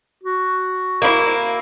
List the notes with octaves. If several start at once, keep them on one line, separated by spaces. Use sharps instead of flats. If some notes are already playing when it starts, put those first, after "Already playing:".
F#4
A#3 E4